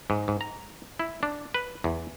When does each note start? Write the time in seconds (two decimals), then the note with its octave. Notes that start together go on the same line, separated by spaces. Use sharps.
0.10 G#2
0.28 G#2
0.41 A#5
1.00 E4
1.23 D4
1.54 B4
1.84 E2